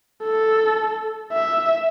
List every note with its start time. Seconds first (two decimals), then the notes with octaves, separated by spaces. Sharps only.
0.23 A4
1.33 E5